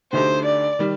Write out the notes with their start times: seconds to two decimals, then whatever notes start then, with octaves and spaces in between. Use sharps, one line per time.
0.13 D2 D3 A3 D#4 G4 C5
0.45 D5
0.79 D#3 G3